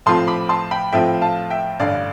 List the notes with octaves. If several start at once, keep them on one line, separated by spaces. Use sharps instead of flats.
A2 F3 C4 F4 A5 C6
B5 D6
A5 C6
G5 B5
A2 F3 C4 F4 E5 G5
F5 A5
E5 G5
A1 G2 D3 D5 F5